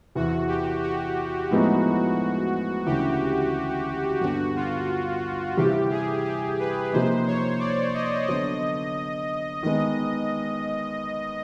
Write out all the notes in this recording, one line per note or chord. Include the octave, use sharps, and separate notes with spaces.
E2 C3 E3 F#4
G4
F#4
A2 F3 G#3 B3 D#4
D2 C#3 E3 G4
G2 D3 G3 B3 D4 F#4
F4
C3 E3 G3 G4
G#4
G4
B4
C3 F3 A#3 D#4 C5
C#5
D5
D#5
D3 F#3 B3 D4 F#4 D#5
D#3 G#3 B3 D#5